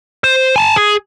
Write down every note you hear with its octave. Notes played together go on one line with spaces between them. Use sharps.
C5
G#5 A5
G#4